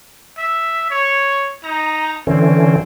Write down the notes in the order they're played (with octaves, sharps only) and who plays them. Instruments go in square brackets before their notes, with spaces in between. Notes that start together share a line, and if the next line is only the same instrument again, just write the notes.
[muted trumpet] E5
C#5
[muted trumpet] D#4 [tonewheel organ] A#5
[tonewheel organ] D3 E3 C#4 [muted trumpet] C4